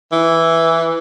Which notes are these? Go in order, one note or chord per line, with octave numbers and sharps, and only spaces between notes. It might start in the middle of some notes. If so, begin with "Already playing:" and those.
E3